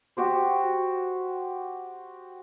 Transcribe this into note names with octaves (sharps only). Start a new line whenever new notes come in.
F#4 G4 C5